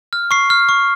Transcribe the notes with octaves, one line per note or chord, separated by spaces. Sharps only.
F6
C#6 C7
F6
C#6